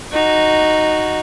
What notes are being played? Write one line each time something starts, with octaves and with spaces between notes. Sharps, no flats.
D#4 F#4